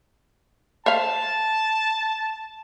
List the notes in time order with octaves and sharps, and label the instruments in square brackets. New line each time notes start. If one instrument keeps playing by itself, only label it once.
[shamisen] C5 E5 F5 [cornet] A5